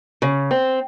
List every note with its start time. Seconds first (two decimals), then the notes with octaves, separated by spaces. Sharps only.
0.22 C#3
0.51 C4